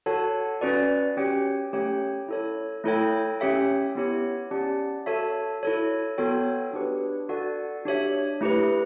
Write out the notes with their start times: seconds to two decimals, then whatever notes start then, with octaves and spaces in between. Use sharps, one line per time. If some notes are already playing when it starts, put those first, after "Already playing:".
0.06 F#4 A4 C#5 F#5 A5
0.61 C#4 F#4 B4 D5
1.17 C#4 G4 C#5 G5
1.73 A3 C#4 G4 C#5 G5
2.28 E4 A4 C#5
2.84 A3 E4 A4 C#5 G5
3.40 C#4 G4 C#5 E5 G5
3.95 B3 E4 G4 C#5
4.51 C#4 G4 D5 F#5 A5
5.06 F#4 A4 C#5 E5 A5
5.63 E4 A4 C#5
6.18 B3 F#4 A4 C#5 G5
6.73 D4 G4 B4
7.29 F#4 A4 D5 F#5
7.85 D4 G4 C#5 E5
8.41 A3 E4 G4 B4